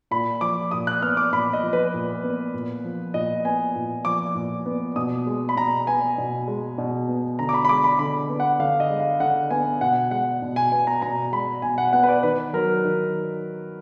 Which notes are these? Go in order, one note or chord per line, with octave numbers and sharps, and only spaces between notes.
A#2 B5
F3 D6
A#2 D#6
F#6
B3 F6
D6
A#2 B5
D#5
F3
B4
A#2
B3
A#2
F3
A#2 D#5
B3 G#5
A#2
F3 D6
A#2
B3
B2 D#6
G#3
B5
B2 A#5
B3 G#5
B2
G#3
B2
B3
D3 A#5
D6
B5
B5
G#3 D6
B5
D3 B5
B3
F#5
D3 F5
D#5
G#3
F5
D3 F#5
B3 G#5
B2 F#5
G#3 F#5
B2
G#5
B3 G#5
A#5
B2 A#5
G#3 B5
B2 G#5
F#5
B3 F#5
B4
D5
D#3 B4
F#3 A#4
D#3